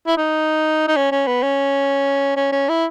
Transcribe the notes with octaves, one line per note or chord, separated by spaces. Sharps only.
E4
D#4
D#4
C#4
C#4
B3
C#4
C#4
C#4
E4